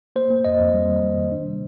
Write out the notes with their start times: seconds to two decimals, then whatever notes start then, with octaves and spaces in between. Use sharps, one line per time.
0.16 A#3 C5
0.30 A#3
0.45 F2 D#5
0.60 F2
0.74 G3
0.89 D#3
1.03 G3
1.17 D#3
1.32 D4
1.46 C3